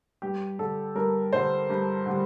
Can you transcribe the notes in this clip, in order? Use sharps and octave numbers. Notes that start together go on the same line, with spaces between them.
G2 G4
D3 G3 A4
G2 A#4
D3 G3 C5
G2
D3 G3